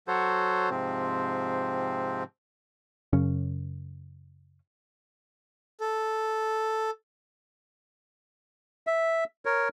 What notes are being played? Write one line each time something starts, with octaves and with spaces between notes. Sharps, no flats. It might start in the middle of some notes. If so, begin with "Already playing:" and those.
F#3 F#4 A4 C5 C#5
G#2 C3 F3 C4
F#2 C#3 C#4
A4
E5
A#4 C#5